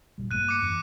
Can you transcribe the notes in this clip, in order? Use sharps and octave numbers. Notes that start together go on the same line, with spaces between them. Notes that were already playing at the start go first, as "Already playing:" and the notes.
A1 A#2 G3
G2 A3 A#3 F#6 D#7
D6 C#7
F#2 E3